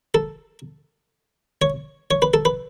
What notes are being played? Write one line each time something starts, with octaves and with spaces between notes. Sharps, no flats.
A4
C#5
C#5
B4
A4
B4